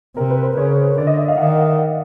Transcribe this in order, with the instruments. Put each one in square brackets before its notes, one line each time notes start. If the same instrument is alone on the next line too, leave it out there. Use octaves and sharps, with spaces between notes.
[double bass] C3 [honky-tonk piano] A#4
[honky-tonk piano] B4
C5
[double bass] C#3 [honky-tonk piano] C#5
[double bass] D3 [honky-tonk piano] D5
[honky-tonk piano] D#5
E5
F5
[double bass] D#3 [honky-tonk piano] F#5